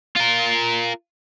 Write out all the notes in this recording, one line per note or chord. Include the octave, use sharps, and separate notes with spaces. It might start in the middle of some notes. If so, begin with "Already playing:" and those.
F4 A#4